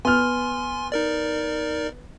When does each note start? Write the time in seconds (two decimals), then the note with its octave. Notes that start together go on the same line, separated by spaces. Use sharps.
0.05 B3 G#5 C6 F6
0.92 D#4 A#4 D5